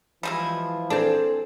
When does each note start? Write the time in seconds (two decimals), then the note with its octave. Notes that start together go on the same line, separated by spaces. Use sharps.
0.23 E3 F3 G3 G#3 E4
0.90 C4 D4 G#4 A4 C5